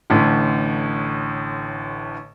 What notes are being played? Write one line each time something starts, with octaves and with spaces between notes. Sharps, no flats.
A1 A2 D3